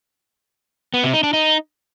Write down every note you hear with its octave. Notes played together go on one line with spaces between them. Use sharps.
B3
C3
D#4
D4
D#4